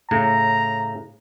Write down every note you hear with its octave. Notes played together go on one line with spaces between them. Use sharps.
A2 C#3 A#5